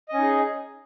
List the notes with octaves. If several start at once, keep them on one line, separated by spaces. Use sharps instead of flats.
C#4 D#4 G#4 D#5